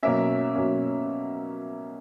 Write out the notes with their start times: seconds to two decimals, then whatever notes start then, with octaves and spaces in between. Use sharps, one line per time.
0.03 B2 F#3 A#3 C#4 E5
0.55 B2 F#3 A#3 C#4